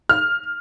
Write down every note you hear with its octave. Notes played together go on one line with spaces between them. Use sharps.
F6